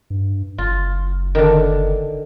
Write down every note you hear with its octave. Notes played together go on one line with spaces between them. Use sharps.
G2
F#1 F4
D3 D#3